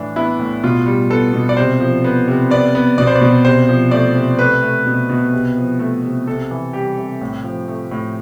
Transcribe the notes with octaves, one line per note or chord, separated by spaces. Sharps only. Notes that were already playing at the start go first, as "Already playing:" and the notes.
Already playing: A2 E3 D4
B3 E4
A2
B2 F4
G3
B3 A4
B2
D5
C3 C5
F3
B3
C3
B3 D5
B3
B2 D5
C5
D5
B2
C3 C5
F3
A3 D5
C3
A3 B4
A3
B2
B2
C3
F3
A3
C3
C3 A4
E3
G3 G4
C3
A2
F3
A3
A2